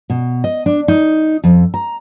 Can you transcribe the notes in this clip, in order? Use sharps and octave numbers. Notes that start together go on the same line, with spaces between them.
B2
D#5
D4
D#4
F2
A#5